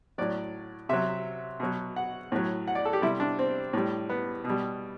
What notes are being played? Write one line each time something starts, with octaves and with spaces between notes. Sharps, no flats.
A2 F#3 D5
C3 F#3 E5
B2 F#3
F#5
A2 F#3
F#5
D5
A4
G4
C3 G3 E4
D4
C4
A2 G3
B3
B2
G3